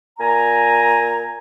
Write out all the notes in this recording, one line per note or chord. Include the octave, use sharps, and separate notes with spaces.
A#2 G#5 A#5